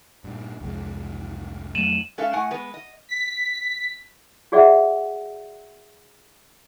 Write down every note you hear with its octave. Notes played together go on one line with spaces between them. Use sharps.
G2 A#2
C2 F2 G#3
F2 F#3 A3 D#7 E7 F#7
G#3 C#4 A4 E5 F5
A2 A3 F#5 G#5
G#3 B3 B4
D#5
B6
F#4 G#4 D5 E5 F#5